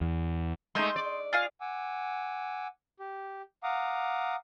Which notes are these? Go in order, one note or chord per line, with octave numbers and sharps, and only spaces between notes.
E2
G#3 A3 D#4 C6 D#6 G6
D5
F4 G#4 F5
F#5 G#5 D6 E6
G4
F5 F#5 A#5 D6 D#6